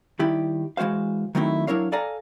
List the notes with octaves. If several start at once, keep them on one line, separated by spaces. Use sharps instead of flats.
D#3 G3 E4 G4
E3 G#3 F#4 C5 F5
D#3 F#3 A3 C4 D#4 E4
F#3 D4 E4 A#4 C#5 F5
A4 D5 F5 G#5 A#5